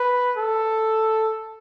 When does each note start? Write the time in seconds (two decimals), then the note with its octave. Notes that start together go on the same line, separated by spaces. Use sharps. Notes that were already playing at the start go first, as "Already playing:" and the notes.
Already playing: B4
0.37 A4